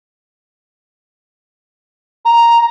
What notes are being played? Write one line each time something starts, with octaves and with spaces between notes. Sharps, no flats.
A#5